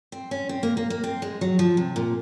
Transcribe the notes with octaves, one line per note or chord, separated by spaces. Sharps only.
C4
C#4
C4
A#3
A#3
A#3
C4
G#3
F#3
F3
C3
A#2